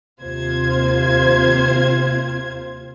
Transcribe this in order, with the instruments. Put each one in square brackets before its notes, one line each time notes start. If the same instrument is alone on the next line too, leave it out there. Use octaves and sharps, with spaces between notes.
[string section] D#2 C3 F4 C5 G#6